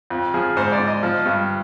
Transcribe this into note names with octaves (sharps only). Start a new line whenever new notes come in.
F2
F3 G#4
G#2 C5
D5
G#2
D#5
F3
G2